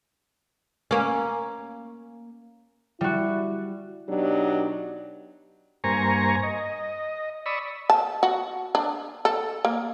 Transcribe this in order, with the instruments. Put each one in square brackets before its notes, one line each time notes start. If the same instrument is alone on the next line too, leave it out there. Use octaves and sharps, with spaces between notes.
[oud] A#3 C#4
[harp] G3 F#4 [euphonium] E4
[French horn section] B2 F#3 D4 D#4 G4
[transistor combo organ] G2 A#3 C5 G#5 A#5 C#6
D#5
D5 B5 C#6 D#6 E6
[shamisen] A5
F#4
D4
A4
A#3